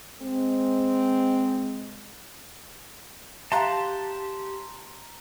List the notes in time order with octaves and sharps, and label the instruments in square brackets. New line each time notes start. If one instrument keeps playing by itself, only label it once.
[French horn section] G#3 C4
[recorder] G4 [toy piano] E5 F5 G5 [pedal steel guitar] A5 C6 F#6 [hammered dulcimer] A#5